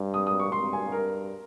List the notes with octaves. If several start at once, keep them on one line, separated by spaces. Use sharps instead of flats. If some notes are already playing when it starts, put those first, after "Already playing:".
Already playing: G2
D#6
D#6
C#6
G2 C6
G#5
A#4